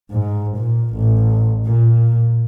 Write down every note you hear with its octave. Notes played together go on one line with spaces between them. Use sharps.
G#2
A#2
A1
A#2